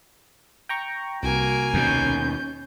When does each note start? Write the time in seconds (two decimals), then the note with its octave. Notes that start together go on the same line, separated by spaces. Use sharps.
0.69 G5 A#5 C#6
1.23 C2 A#3 F#4 G#5 D7
1.74 D#2 B2 C#4 G6